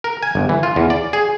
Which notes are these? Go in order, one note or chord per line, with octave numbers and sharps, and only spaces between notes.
A#4
G#5
G1
E3
F4
E2
D5
G#4